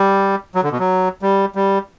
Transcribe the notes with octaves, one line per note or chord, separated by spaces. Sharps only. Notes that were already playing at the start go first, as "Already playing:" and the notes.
Already playing: G3
F#3
D3
B2
F#3
G3
G3